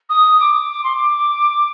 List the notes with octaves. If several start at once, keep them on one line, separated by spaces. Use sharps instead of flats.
D#6
D6
D6
C6
D6